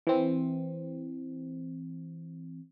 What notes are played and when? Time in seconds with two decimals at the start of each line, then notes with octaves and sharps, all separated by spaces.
0.07 E3 C4